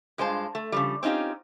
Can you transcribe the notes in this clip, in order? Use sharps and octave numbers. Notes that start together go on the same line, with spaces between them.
G2 G#3 F4 C5 A5
A3
C#3 F3 G3
C4 C#4 D#4 F4 G4